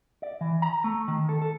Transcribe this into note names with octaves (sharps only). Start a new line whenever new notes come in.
D5
E3
A#5
A3
D#3
A4
A4